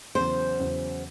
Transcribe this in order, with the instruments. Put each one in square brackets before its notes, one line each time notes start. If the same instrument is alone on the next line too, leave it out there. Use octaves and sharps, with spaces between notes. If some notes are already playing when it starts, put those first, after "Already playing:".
[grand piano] E2 C#3 F#3 [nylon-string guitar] C5
[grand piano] E2 C#3 F#3